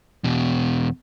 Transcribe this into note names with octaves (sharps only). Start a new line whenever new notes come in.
E2 B2